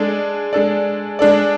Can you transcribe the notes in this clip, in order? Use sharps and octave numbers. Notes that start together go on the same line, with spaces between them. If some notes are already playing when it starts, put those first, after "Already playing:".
Already playing: G#3 D4 A4 D5
G#3 D4 A4 D5
G#3 D4 A4 D5